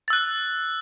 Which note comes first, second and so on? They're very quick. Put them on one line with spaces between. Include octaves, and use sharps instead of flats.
A6 E6 F#6